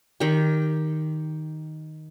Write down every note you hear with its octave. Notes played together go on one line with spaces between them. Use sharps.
D#3 G4